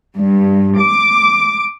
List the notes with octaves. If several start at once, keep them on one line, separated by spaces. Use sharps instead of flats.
G2
D6